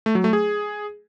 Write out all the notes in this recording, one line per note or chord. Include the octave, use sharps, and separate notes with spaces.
A3
F#3
A3
G#4